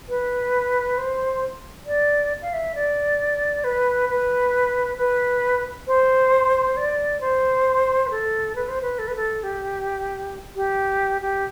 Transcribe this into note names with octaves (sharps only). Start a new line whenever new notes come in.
B4
C5
D5
F5
E5
D5
B4
B4
B4
C5
D5
C5
B4
A4
B4
C5
B4
A4
B4
A4
G4
G4
G4